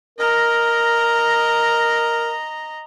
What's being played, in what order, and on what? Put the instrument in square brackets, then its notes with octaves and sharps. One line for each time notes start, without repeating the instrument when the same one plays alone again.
[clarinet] A#4 [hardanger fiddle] D#5 A#5